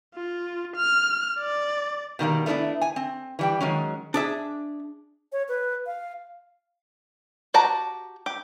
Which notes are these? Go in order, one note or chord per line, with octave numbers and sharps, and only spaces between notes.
F4
F6
D5
B2 D#3 G3 A#3
A3 B3 C#4 D4 E4
G#5
C4
E3 G3 G5
D#3 F#3 G#3 C#4
D4 G#4 E5
C#5
B4
F5
F#4 G4 A5 A#5
G4